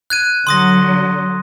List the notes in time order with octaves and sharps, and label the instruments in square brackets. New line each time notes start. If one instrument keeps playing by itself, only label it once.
[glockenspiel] F#6 G#6 D#7
[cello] D3 F#3 [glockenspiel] C6 D#6 A#6